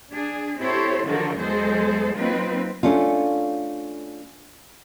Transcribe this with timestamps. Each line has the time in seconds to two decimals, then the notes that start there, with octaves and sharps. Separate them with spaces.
0.12 D4 G#4
0.59 C4 E4 G4 A4 C5 C#5
1.05 D3 D#3 F3 F#4 A4 A#4
1.37 E2 F#3 G#3 G#4 A4 C5
2.16 F#3 A#3 C4 D#4 F4 B4
2.83 A3 C#4 D4 F4